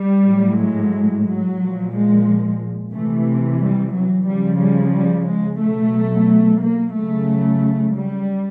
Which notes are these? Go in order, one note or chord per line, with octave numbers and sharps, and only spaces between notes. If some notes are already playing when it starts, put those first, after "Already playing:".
Already playing: G3
A2 F#3
G#3
F#3
A#2 F3
G#3
C3 E3 A3
G3
F#3
C#3 F3 G3
G3
G3
G#3
B2 F#3 A3
A#3
C#3 F#3 A3
G3